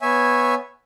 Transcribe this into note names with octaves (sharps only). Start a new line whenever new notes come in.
B3 C#5 E5 G#5